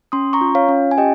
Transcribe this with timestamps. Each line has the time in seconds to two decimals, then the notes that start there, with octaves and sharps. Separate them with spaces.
0.12 C#4 C6 D#6
0.33 A#5 C#6
0.41 F4
0.55 C#5 F5
0.69 C#4
0.91 G#5
0.98 G4 D#5 G5